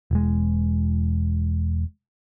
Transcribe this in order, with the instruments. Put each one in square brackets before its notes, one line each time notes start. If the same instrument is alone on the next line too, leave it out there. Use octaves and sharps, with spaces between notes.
[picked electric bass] E1 G#3